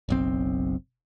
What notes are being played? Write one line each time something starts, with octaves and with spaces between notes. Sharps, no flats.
F#1 B1 C4